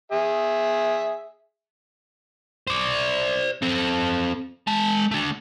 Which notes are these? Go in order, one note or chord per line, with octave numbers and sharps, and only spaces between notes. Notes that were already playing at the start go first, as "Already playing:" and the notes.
G#4 E5
C5 D5
C4 A4
G#3 A5
A3 D4